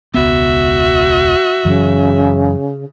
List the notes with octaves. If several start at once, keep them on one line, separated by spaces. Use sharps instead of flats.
E1 C#2 B3 F#4 E5
F#2 C#3 E3 F#3